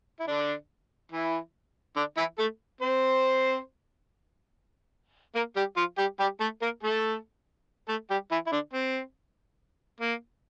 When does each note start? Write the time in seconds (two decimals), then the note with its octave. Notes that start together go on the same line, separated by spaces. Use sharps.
0.20 E4
0.28 D3 D4
1.12 E3 E4
1.96 D3 D4
2.17 E3 E4
2.38 A3 A4
2.81 C4 C5
5.35 A#3 A#4
5.56 G3 G4
5.77 F3 F4
5.98 G3 G4
6.20 G3 G4
6.40 A3 A4
6.62 A#3 A#4
6.83 A3 A4
7.88 A3 A4
8.10 G3 G4
8.31 E3 E4
8.46 E4
8.52 D3 D4
8.73 C4
10.01 A#3